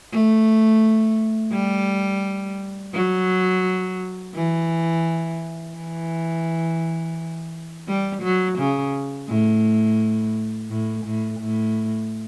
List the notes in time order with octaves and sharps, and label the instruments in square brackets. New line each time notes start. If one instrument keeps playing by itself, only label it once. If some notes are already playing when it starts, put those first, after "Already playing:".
[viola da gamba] A3
G3
F#3
E3
E3
G3
F#3
C#3
A2
A2
A2
A2